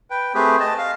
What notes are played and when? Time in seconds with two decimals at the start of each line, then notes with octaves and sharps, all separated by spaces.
0.10 B4 G5
0.34 A3 C4 G4 G#4 B4
0.60 D#5 A5
0.78 F5